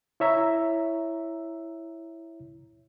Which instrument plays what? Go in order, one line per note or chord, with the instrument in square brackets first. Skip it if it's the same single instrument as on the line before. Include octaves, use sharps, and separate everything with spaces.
[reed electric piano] E4 C#5 E5 A#5 E6